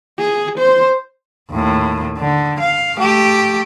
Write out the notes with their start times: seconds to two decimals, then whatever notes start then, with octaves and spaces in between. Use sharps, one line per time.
0.18 G#4
0.58 C5
1.51 D#2 A2
2.17 D3
2.60 F5
2.98 A3 G4